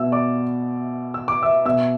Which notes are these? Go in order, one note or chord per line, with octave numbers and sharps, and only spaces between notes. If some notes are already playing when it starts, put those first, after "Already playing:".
Already playing: B2 E5 E6
D5 D6
E6
D6
E5 E6
B2 E5 E6